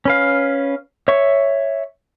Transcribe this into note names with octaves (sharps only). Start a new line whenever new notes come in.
C#4 B4 F5
C#5 E5 C#6